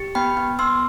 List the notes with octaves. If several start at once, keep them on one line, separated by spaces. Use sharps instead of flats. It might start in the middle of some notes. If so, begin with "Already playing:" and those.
Already playing: G4
B3 G5 B5
B3
B3 C6 E6